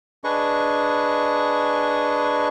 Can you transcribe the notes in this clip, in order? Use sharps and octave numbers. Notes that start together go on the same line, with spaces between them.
D4 G#4 B4 D#5 C#6